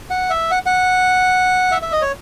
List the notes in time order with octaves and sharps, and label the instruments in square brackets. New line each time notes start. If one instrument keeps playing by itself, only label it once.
[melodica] F#5
E5
F#5
F#5
E5
E5
D#5
C#5